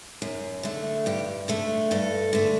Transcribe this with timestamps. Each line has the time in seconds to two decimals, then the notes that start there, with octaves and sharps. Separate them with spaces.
0.22 F#2
0.63 D3 A3
1.06 G2 G4
1.48 D3 A3 A4
1.91 G2 A4
2.33 D3 A3